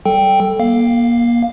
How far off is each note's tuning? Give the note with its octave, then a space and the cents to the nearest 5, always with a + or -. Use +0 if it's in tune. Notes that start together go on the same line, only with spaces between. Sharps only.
G3 -30 A4 +0 G5 +0
A#3 +30 F5 +0